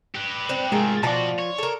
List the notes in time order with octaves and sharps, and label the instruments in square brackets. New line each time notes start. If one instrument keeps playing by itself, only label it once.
[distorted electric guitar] G4 B4
[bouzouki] C4 D4
[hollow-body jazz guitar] G#2 [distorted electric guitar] C3 A3 [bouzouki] F4 G#4 A#4
[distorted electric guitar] B2 F#4 [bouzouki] F3 F4 [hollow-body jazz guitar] D5 G5 A5
[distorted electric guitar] C#5
[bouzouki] A4 A#4